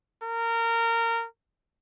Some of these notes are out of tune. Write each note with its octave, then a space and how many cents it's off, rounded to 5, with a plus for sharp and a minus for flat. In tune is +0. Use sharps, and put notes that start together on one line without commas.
A#4 -20